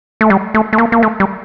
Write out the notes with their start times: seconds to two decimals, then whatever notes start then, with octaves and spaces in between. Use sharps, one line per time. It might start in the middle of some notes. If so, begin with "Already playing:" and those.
0.21 A3
0.30 G3
0.54 A3
0.73 A3
0.78 A#3
0.92 A#3
1.03 A3
1.20 G3